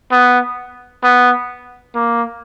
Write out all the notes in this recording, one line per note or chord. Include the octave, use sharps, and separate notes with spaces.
B3
B3
A#3